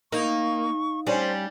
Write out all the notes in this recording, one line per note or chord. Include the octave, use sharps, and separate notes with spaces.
A#3 D#4 C#6
G3 C#4 D4 C5